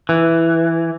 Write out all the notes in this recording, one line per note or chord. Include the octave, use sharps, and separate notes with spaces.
E3